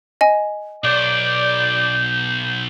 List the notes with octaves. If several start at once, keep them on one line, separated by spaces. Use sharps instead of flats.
D#5 G#5
B1 D5 G6